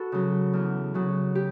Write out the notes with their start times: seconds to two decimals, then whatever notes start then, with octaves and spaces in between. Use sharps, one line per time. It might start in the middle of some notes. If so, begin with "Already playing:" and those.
Already playing: F#4 A4 B4
0.12 C#3 F#3
0.53 E2
0.94 C#3 F#3
1.35 G4